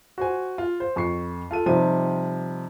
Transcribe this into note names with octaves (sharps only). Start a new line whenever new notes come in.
F#4 C5 G#5
F4
C5
F2 C#6 C7
F4 A4 D#7
C3 F3 G3 D#4 D#7